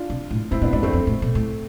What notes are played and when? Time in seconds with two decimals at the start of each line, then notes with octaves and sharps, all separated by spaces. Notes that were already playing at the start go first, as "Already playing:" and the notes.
Already playing: D4 F4
0.10 C3
0.31 A2
0.51 G#2 C4 E4
0.62 A2 B3 D4
0.73 G#2 B3 D4
0.83 E2 A3 C4
0.93 F2
1.07 A2
1.22 B2
1.35 A2